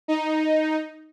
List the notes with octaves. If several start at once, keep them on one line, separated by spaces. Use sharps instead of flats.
D#4